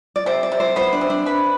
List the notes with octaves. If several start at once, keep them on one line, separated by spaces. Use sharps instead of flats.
D5
C3 C5
D5
C3
C5
B3 C5
D4
C3
D4
B4